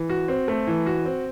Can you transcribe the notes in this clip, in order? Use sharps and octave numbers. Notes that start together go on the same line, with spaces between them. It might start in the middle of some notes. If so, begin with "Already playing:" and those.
Already playing: E3
F#4
C4
A3
E3
F#4
C4